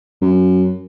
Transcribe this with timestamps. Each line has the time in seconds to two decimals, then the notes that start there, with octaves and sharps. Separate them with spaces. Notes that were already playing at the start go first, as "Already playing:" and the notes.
0.21 F#2